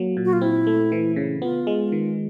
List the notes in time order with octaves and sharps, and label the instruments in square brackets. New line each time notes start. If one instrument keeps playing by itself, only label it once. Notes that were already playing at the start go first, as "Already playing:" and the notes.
Already playing: [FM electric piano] F#3 A#3
A#2
[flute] F#4
F4
[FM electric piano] C4 [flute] E4
[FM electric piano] A3
E3
C#3
[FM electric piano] B3 [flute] F4
[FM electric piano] G#3
D#3